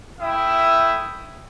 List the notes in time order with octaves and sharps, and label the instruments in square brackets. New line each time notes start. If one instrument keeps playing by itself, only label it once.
[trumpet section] A3 E4 E5 G5 D#6